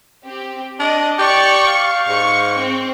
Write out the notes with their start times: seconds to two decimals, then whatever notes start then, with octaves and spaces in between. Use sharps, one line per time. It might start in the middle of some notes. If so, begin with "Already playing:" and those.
0.24 C4 G4
0.80 D4 D#5
1.18 G4 D5 C#6
1.67 F5
2.08 G#2 C#6
2.59 C4